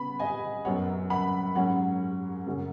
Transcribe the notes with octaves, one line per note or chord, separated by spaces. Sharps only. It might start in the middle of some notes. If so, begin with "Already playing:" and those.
Already playing: C#3 B3 B5
D#5 G#5
F#2 F#3 B3 C#5 F#5
F#5 B5
G#2 F#3 C#4 C#5 F#5
F#2 C#3 F#3 C#4